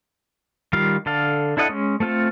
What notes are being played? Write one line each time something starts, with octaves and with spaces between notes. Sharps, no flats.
D#3 G3 F4 F5
D3 A4 F5
D4 E4 A4 D#5 F#5
G#3 C#4
A3 C4 F4 A4